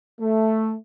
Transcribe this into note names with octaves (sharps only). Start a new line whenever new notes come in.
A3